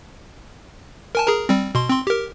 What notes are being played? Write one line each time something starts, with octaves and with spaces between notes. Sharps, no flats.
A#4 G#5 A5
G#4 A#4 A#5
G3 C4
B2 C6
C4 C6
G4 A#4